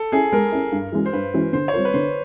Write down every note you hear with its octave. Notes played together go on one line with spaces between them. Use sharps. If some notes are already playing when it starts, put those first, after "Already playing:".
Already playing: A4
C#4 E4 G#4
G#3 A#4
C#4 E4
G2
E3 G#3 C#4 F#4
C5
G2 B4
E3 G#3 C#4 F#4
D3 C5
C#5
G3 C4 F4 A#4 C5
B4
D3 C5